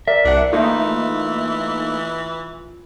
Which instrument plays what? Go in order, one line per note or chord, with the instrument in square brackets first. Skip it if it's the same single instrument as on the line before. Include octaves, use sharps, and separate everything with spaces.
[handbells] A#4 D5 [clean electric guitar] E5
[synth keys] C2 F#5 [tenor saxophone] D4
[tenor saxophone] E3 [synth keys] A3 A#3 D#4 [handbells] F4